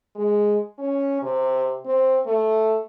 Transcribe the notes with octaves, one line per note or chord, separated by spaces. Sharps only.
G#3
C#4
C3
C4
A3